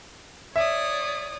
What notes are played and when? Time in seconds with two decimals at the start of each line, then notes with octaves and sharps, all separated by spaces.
0.56 C#5 D5 E5 D#6